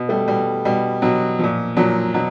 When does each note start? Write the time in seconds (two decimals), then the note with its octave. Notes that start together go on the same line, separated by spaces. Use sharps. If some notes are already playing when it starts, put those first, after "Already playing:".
Already playing: B2
0.09 G3 A3
0.28 B2 G3
0.65 B2 G3
1.02 B2 F#3
1.39 A#2 F3
1.77 A#2 F3 F#3
2.14 B2 F#3